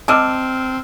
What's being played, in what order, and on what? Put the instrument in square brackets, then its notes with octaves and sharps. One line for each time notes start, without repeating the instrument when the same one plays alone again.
[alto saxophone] C4 [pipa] D5 D#5 [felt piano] A5 E6 F6